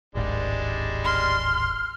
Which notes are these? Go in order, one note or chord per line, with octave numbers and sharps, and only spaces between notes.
D1 G#1 G3 G#3 D4
C6 F6